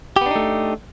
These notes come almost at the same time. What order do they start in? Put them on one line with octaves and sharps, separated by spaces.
G4 B3 D4 D#4 A3